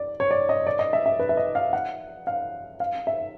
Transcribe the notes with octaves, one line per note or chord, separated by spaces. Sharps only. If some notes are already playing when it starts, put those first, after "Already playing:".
Already playing: D5
C#5
D5
D#5
D5
D#5
E5
E5
B4
E5
D#5
F5
F#5
F5
F5
E5